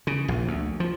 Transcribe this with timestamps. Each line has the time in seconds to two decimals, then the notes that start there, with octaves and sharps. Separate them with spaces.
0.07 C#3
0.28 A#1
0.47 D2
0.80 F3